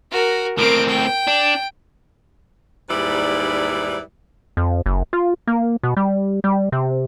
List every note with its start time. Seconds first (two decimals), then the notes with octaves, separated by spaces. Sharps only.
0.12 F#4 A#4
0.58 A2 C4 A#4 D6
0.88 G5
1.27 D4
2.89 D#2 G#2 G3 E4 B4 D5
4.57 F2
4.86 F#1
5.13 F4
5.47 A#3
5.83 B2
5.97 G3
6.44 G3
6.72 C3